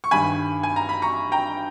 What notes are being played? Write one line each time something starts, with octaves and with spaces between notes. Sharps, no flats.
C#6
G1 G2 D#3 G#5 B5
G#5
A#5
B5
A#5 C#6
G5 A#5